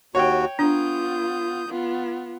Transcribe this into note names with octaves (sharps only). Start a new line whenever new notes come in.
D#2 F#4 C#5 G5
B3 D4 F4 D#6 G6
B3 F4